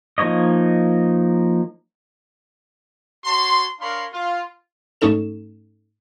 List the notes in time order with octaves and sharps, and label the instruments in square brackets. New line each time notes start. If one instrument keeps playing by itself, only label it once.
[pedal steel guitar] F3 A#3 D#4 C#5 D#5
[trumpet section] F#4 C#5 A5 C6
D4 A#4 C#5 F5 B5 C6
F4
[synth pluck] G#2 A3 C#4 D#4 A4 E7